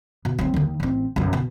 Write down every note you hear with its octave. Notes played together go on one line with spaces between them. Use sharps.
B2
F#3 C4
D#2 D#3
A1 C4
B1 F#2
B2